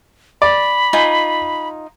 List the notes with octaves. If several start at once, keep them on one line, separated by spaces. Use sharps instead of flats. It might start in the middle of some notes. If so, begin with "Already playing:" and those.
D5 B5
D#4 F4 G#5